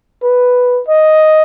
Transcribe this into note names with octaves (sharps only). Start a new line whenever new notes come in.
B4
D#5